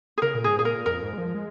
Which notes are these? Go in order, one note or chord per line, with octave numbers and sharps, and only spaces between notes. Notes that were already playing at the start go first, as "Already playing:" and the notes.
G#4
C#3 A#4
A#2
G#2 G#4
A#2 G#4
A#4
F2 A#4
G#2
G#3
F3
G#3